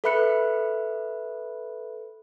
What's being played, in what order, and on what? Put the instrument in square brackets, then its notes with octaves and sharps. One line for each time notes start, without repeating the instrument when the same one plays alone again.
[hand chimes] A4 B4 E5 B5 F#6 C#7